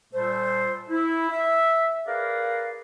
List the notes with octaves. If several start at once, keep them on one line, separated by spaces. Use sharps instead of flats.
A#2 G3 A3 A4 C5
E4
E5
G#4 A#4 B4 D5 F5